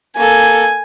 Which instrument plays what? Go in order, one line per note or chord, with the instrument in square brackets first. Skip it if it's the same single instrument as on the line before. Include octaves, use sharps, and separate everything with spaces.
[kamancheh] A#3 A4 [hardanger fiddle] G#5